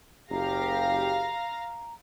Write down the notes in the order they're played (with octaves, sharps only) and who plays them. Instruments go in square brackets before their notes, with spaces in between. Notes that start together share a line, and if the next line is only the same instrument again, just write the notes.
[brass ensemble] F#1 G4 [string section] F5 A#6 [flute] A#5